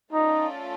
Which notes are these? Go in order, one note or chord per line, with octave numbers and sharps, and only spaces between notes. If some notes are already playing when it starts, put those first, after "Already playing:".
A3 C#4 D#4 F4 A4 D5